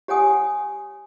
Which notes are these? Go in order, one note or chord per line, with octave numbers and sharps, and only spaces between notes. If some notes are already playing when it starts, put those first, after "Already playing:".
G4 C#5 F#5 G#5 D#6